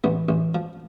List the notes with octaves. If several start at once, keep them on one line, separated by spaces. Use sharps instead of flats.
A1 B3
A1
F3